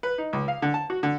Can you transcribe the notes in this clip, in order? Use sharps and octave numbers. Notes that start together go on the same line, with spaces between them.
B4
D#4
C#2
F5
D3
A5
F#4
D3